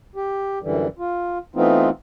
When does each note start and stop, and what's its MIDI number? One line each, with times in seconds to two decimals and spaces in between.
0.16 0.59 67
0.62 0.87 42
0.62 0.87 50
0.62 0.87 52
0.62 0.87 55
0.99 1.38 65
1.55 1.90 52
1.55 1.90 57
1.55 1.90 59
1.55 1.90 60
1.55 1.90 63
1.55 1.90 65